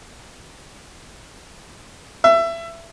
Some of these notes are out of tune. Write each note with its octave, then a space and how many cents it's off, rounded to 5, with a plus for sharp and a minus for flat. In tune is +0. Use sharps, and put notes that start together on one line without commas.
E5 +20